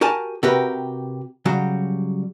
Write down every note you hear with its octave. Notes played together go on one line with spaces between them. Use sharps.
F#4 G4 A#4 G#5 A5
C3 F#4 G4 A#4 B4
C#3 F#3 G3 F#4